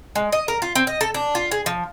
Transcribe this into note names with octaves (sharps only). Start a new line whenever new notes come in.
G#3
D#5
A#4
F4
C4
D#5
A4
D4
F4
G#4
F3